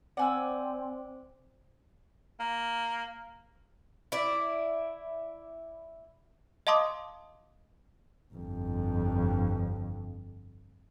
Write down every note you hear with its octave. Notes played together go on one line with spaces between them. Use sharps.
C4 C5 D5 F#5 G#5 D6 E6
A#3
E4 D5
D#5 F5 A5 C6 D6 D#6
G1 F2